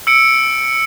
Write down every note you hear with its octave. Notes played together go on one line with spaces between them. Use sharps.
E6 C#7 D7